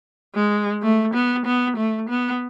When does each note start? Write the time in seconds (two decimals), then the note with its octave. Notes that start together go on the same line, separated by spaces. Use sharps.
0.35 G#3
0.82 A3
1.14 B3
1.45 B3
1.77 A3
2.09 B3